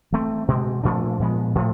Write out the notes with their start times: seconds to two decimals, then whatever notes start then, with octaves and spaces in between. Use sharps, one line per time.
0.12 E3 A3 C4
0.48 B2 G#3 C4
0.83 A#2 F3 A3 D4
1.20 A#2 F3 G#3 B3
1.55 A2 F3 A3